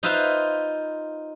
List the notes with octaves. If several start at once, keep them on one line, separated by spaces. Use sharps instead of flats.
D#4 F4 B4 C5 E5 F5